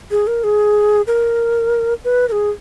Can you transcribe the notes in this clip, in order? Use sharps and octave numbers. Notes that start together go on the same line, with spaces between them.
G#4
A#4
G#4
A#4
B4
A#4
G#4